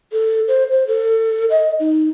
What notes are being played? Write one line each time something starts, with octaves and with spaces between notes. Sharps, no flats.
A4
C5
C5
A4
D#5
D#4